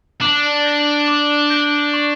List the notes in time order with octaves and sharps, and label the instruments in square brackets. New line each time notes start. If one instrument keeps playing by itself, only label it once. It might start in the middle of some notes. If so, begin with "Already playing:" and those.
[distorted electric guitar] D4 [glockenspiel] D6
[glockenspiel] G6 A#6 D7 F#7
D6
G6 A#6 D7 F#7
C#6